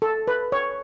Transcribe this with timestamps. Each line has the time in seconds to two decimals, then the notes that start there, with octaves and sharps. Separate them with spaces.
0.02 A4
0.28 B4
0.52 C#5